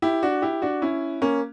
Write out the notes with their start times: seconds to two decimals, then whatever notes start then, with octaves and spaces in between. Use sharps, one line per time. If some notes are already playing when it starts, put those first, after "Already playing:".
0.02 E4 G4
0.23 D4 F#4
0.42 E4 G4
0.62 D4 F#4
0.82 C#4 E4
1.22 A#3 C#4